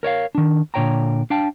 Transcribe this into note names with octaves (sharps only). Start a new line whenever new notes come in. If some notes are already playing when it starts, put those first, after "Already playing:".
A#4 C#5 D5 F5
D#3 D4
A#2 D3 C#5 G5 A#5
D4 F5 G5 A5